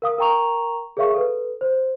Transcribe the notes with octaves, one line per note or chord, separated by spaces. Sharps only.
A#4 F5 D#6
A#4 G5 A#5 C#6 F7
G#4 A#4 C#5 E5 F5 C#6
A4 B4
C5